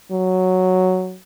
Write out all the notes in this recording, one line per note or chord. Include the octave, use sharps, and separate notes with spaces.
F#3